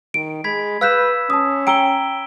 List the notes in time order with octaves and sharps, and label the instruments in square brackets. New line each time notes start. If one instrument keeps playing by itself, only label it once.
[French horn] D#3 [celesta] D7
[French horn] G#3 [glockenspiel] B5 G#6 B6
[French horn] B4 [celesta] F5 F#6 G6 [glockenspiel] E6 B6 E7
[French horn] C#4 [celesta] A5 D#6
[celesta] G5 A#5 E6 [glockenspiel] D7 G7